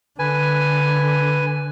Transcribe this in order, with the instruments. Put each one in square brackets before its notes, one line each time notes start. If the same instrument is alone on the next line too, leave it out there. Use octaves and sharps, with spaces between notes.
[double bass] D3 [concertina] B4 G#5